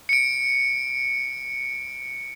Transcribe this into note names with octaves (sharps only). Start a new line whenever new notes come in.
C#7 D7